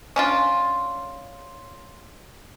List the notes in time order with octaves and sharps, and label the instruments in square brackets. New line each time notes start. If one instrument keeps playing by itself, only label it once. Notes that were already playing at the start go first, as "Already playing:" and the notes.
[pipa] C#4 D4 F4